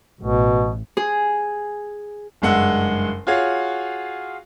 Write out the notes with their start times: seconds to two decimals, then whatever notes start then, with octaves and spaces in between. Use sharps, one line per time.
0.21 A1 B2
0.97 G#4
2.42 F#1 G2 G#3 F#5 E6
3.27 F4 F#4 G#4 C#5 F5